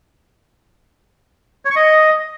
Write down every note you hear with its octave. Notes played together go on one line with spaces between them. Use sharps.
C#5
C#6
D#5